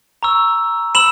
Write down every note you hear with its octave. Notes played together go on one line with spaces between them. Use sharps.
A#5 C#6 E6
B5 E6 E7 F#7